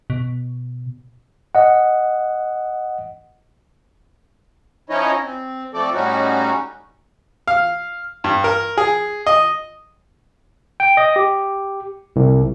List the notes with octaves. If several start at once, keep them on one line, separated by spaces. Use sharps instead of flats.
B2
D#5 F#5
F3 C#4 D#4 E4 C#5 D#5
C4
F3 A3 C4 A4 D5
A2 G3 C#4 D#4 F#4
F5
G2
A#4
G#4
D#5
G5
D#5
G4
C2